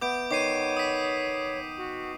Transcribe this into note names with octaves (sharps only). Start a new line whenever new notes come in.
B3 E5 D6 G6 D7
D#3 C#5 D6 C7 D#7
D#6 B6
F#4